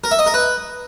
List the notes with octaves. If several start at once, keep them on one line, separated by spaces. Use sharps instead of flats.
A#4
E5
D#5
A#4
B4